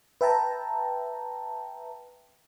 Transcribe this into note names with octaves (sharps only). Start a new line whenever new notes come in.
B4 E5 G5 A5 A#5